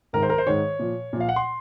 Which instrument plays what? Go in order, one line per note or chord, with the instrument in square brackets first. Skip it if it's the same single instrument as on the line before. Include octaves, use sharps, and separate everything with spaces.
[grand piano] G#2 D#3 A#4
C5
A#4
C5
G#2 D#3 C#5
A#2 F3
A#2 F3
F5
F#5
C6